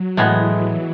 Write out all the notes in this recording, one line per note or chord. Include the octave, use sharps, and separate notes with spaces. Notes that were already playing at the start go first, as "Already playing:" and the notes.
Already playing: F#3
A2 E3 G#3 B3